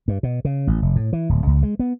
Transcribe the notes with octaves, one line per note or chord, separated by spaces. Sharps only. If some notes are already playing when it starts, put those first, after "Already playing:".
G2
B2
C#3
A1
F1
A2
E3
D1
C#2
G#3
B3